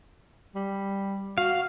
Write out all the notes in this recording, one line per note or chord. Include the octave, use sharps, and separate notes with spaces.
G3
F#4 F5